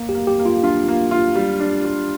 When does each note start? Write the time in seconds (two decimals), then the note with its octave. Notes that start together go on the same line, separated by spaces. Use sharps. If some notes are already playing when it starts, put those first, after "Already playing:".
Already playing: A#3
0.09 G4
0.15 A#3
0.27 G4
0.39 A#3
0.46 F4
0.63 D4 F4
0.88 A#3
1.11 F4
1.35 G3
1.60 D4
1.85 G3